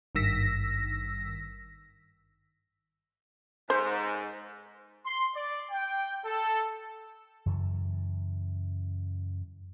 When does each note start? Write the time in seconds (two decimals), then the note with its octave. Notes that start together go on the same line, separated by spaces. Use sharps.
0.15 G#1 G2 D#3 E6 A#6 B6
3.70 G#2 C5
5.06 C6
5.35 D5
5.71 G5
6.26 A4
7.46 F#2 C#3 E3 F#3